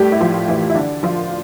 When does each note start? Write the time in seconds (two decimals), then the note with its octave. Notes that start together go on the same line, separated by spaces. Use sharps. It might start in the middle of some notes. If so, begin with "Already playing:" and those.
Already playing: A2 G3 A3 G4
0.12 E4
0.21 F3 F4
0.48 E3 E4
0.70 E4
0.75 D3 D4
1.03 F3 F4